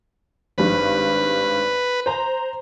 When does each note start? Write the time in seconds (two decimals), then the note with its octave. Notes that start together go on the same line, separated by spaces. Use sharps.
0.58 G#1 G2 B4
2.06 C5 A#5